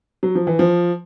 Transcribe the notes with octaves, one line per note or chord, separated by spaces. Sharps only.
F#3
F3
E3
F3